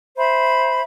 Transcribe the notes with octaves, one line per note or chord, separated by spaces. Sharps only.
C5 E5 B5